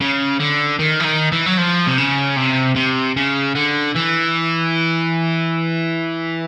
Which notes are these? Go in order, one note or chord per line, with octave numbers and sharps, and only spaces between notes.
C#3
D3
D#3
E3
D#3
E3
F#3
F3
C3
C#3
C3
C3
C#3
D3
E3